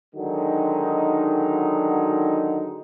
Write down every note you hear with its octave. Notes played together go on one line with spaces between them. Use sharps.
D3 D#3 F#3 G#3 D#4